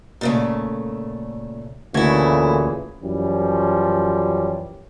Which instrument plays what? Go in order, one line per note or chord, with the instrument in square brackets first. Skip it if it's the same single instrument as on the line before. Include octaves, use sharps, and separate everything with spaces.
[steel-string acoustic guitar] A#2 C#3 A3
[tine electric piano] D2 F#4 G#6 [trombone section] A#2 C#3 E3 [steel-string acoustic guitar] A3 E4
[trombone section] F#2 E3 F3 G3 C#4